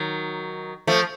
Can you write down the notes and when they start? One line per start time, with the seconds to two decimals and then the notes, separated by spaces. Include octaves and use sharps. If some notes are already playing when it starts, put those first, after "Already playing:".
Already playing: D#3 F#3
0.87 F3 A3